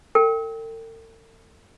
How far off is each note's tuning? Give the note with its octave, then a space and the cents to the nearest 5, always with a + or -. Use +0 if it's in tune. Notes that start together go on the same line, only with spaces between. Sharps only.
A4 +45 G5 +0